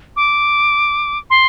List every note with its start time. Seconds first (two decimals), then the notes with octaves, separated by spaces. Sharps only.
0.16 D6
1.30 C6